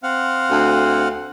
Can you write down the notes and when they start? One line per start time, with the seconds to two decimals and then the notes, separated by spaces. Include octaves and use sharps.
0.03 C4 F5 F#5
0.50 D2